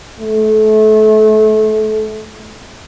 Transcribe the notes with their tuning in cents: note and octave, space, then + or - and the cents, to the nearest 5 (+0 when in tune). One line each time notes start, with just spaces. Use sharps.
A3 -30